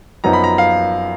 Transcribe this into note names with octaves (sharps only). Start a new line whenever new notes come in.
F#2 F3 B3 D#4 A#5
B5
A#5
F5